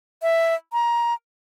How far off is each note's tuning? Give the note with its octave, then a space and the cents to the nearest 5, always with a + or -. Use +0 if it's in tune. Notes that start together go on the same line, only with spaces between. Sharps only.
E5 +5
A#5 +20